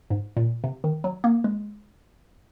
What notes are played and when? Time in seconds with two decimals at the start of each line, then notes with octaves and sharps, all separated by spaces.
0.10 G#2
0.37 A#2
0.64 C3
0.84 D#3
1.04 F#3
1.24 A#3
1.44 G#3